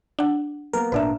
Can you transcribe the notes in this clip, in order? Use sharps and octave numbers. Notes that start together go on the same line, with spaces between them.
D4 F#5
A#3 B3 A#4
G#1 A#2 D4 B4 D5 E5